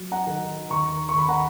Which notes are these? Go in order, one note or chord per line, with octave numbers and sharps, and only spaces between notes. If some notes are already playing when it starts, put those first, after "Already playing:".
Already playing: F#3
F#5 A#5
D#3
D#2 A#5 C#6
C#6
D#2 B5
F#5 A#5